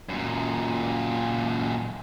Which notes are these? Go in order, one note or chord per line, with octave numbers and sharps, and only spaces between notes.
F#2 A#2